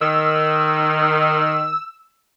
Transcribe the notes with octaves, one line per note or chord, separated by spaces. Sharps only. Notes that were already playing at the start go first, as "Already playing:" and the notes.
D#3 E6